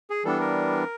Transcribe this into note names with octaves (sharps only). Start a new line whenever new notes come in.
G#4
E3 G3 B3 D4 A4
A#4